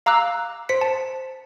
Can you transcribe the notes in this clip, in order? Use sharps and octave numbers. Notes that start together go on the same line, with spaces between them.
F5 A#5 D6 E6 F#6
C5 B6 C#7
A5